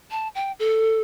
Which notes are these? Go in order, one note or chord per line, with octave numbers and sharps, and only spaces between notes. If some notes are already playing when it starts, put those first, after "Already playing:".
A5
G5
A4